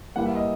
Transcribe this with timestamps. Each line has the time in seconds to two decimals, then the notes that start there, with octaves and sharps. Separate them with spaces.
0.16 E3 G3 A#3 F#5
0.26 E5
0.35 D#5